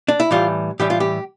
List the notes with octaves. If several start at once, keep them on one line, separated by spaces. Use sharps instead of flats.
D4
E4
A2 E3 G3 F4
A2 E3 G3 G4
F4
G4